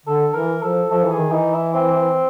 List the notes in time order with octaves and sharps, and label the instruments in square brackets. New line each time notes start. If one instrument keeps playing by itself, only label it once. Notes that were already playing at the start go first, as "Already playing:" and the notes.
[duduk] D3 [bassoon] A4
[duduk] E3 [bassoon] A#4
[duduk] F3 [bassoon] A4
[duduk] F3 [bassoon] A4
[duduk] E3
[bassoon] G#4
[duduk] D#3
[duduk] E3 [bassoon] D#4
[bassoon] E4
C4